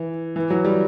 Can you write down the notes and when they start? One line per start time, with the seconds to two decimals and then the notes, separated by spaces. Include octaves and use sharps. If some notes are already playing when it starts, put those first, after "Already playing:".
Already playing: E3
0.36 E3
0.50 F#3
0.65 G3